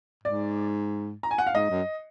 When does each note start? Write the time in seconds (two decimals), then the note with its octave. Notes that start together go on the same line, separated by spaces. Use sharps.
0.24 G#2 D5
1.23 A#5
1.31 G#5
1.38 F#5
1.47 F5
1.55 G#2 D#5
1.70 F#2